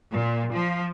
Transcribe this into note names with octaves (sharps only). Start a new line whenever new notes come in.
A#2
F3